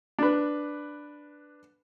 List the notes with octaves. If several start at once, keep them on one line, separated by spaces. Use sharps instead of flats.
D4 B4